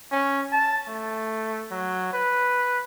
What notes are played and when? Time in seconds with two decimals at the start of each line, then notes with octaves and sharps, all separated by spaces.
0.12 C#4
0.52 A5
0.88 A3
1.71 F#3
2.13 B4